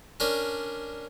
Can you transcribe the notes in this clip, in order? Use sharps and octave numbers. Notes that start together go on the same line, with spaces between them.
C#4 D4 A#4 D5